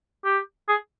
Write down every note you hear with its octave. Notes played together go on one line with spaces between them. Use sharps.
G4
G#4